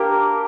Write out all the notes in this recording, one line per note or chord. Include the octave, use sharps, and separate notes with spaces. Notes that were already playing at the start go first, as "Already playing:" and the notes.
Already playing: A#3 D4 G4 A#4